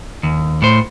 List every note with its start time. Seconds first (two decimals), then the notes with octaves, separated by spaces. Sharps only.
0.23 D#2
0.62 A2 C5